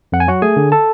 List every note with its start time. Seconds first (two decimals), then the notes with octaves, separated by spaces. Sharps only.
0.12 F2 F#5
0.20 G#5
0.28 F#3 F#4 F#5
0.42 A3 G#4 G#5
0.57 D3
0.72 A4 A5